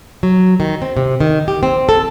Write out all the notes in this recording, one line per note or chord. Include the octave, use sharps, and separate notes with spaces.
F#3
D#3
C4
C3
D#3
G4
C4
A4